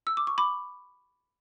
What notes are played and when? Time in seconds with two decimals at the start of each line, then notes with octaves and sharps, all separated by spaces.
0.07 E6
0.17 D6
0.27 C#6
0.38 B5 D6